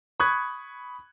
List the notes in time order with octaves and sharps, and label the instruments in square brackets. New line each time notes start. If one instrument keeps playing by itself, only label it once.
[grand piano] B5 C#6 D#6 F#6 G#6